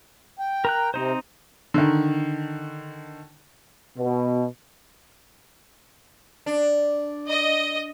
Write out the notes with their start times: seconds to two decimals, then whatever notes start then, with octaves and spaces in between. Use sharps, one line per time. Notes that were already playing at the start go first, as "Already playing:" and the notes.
0.39 G5
0.65 A#4 A#5 F#6
0.94 C3 C4 D#4 C5
1.74 D3 D#3
3.98 B2
6.46 D4
7.28 D#5